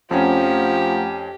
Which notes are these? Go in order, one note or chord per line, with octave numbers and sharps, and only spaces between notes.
F2 F3 A3 C#4 G4 F#5 A#5